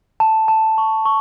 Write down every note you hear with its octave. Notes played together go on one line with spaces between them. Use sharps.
A5
A5
C#6
C#6